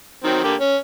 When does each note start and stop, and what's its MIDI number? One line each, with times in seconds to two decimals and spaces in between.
0.24 0.39 51
0.24 0.39 54
0.24 0.39 60
0.44 0.54 50
0.44 0.54 58
0.44 0.54 67
0.60 0.76 61